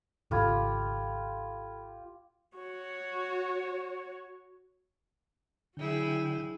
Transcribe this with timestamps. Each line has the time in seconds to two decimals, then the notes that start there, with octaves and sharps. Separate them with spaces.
0.31 G#1 C#2 F4 G4 A4 B5 G#6
2.58 F#4 C#5
5.77 D3 F#3 E4 G#4 G5